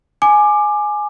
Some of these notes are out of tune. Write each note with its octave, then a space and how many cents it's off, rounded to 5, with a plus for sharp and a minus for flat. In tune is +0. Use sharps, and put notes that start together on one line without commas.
G#5 +10 D6 +20